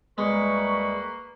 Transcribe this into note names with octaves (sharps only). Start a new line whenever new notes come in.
D2 G3 G#3 A#3 A#4 B4 C#6